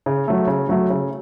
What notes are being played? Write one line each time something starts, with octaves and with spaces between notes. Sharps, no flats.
C#3
F#3 A3
C#3
F#3 A3
C#3